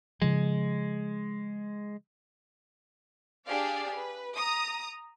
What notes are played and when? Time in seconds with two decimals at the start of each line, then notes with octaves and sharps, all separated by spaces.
0.22 C#3 F3 G#3
3.46 D4 G4 G#4 D5 F5
3.94 B4
4.36 A#5 D#6